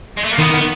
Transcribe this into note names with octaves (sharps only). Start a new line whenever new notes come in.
G#3
A3
A#3
D#3 B3
B3